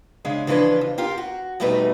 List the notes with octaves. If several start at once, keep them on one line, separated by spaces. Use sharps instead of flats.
C#3 G#3 D4
C#3 E3 F3 D4 B4
F2
F4 G4 A#4
F#4
E2 B2 G3 A3 D#4 B4